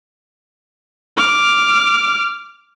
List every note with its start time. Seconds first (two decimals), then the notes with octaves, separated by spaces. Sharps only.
1.17 D6 F6